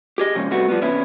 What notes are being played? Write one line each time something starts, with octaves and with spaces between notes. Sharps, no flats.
G4 G#4 D#5
C3 F3 G#3 C#4
C3 G3 A3 B3 F#4
F3 G3 B3
C3 E3 B3 C#4 E4